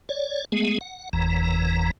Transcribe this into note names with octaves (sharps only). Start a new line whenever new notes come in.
C#5 D5
G#3 A3 B3 G#4
F#5
F#1 E2 E3 A#5